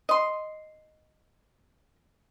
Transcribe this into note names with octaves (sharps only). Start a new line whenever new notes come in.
D#5 C6